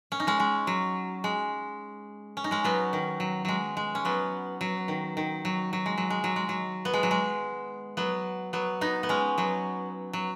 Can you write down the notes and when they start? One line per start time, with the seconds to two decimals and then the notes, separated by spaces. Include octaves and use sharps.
0.12 C#4
0.20 D#4
0.27 G#3 C#4
0.40 G#3
0.67 F#3
1.24 G#3
2.37 C#4
2.44 D#4
2.51 G#3 C#4
2.64 F#3 B3
2.93 D#3
3.20 F#3
3.45 F#3 G#3
3.77 G#3
3.95 C#4
4.05 F#3 B3
4.61 F#3
4.88 D#3
5.17 D#3
5.45 F#3
5.73 F#3
5.86 G#3
5.98 F#3
6.10 G#3
6.24 F#3
6.36 G#3
6.49 F#3
6.85 B3
6.94 G#3
7.03 F#3
7.11 G#3
7.97 F#3 B3
8.53 F#3 B3
8.81 B3 D#4
9.03 B3
9.09 G#3 C#4
9.38 F#3 B3
10.13 F#3